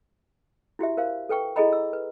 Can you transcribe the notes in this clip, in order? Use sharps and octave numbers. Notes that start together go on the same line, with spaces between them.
E4 F#4 G4 E5
A#4 C5 F5
A4 B4 G5 C#6
E4 G#4 A4 D#5 A#5 B5
E6
B4